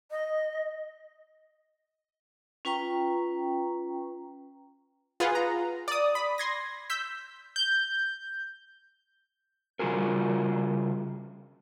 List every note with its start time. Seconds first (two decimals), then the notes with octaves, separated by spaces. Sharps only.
0.11 D#5
2.65 C#4 F4 B4 G5 A#5 C#6
5.20 F4 G#4 B4 F#5
5.35 A#5
5.88 D5 D#6
6.15 B5
6.38 C6 G#6 A#6
6.90 E6 G6 B6
7.56 G6
9.79 C#3 G3 F4 F#4 G#4 A#4